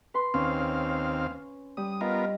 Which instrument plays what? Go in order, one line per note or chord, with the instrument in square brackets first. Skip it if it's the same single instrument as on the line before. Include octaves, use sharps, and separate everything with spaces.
[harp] B4 C6
[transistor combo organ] D#2 C4 F5 [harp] C#4
[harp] G3 [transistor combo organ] D#6
[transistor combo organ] B3 F4 A#4 [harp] D#5